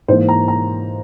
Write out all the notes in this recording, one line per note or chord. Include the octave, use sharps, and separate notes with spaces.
G#2 E3 A#3 C5
A#5
A#5